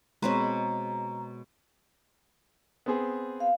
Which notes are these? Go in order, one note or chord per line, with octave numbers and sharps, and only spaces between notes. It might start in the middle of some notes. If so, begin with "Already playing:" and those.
B2 G#3 C4 B4 C#5 A#5
B3 C4 G#4
F5